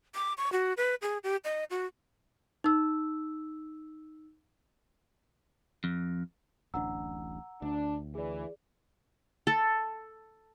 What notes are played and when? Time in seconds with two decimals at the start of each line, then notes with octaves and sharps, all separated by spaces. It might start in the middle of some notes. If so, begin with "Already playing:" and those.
0.15 D6
0.38 C#6
0.52 F#4
0.77 B4
1.02 G#4
1.24 G4
1.45 D#5
1.70 F#4
2.64 D#4 E6
5.84 F2
6.74 D1 A1 D4 F#5 A#5 E6
7.62 D2 D4
8.15 E3 G#4 D5
9.47 A4